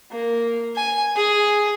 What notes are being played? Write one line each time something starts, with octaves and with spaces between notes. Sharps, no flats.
A#3
G#5
G#4